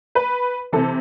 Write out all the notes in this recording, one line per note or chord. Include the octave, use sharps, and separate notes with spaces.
B4
C3 E3 A4